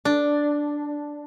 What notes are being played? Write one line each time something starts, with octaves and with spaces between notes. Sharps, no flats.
D4